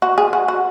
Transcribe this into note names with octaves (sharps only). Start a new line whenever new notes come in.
F#4
G#4
F#4
F#4